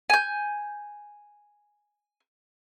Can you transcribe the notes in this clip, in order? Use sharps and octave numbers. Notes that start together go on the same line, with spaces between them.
G#5 G6